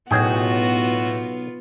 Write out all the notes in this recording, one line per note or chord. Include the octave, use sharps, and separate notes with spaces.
B1 A2 B3 F4 F#4 G#4 G5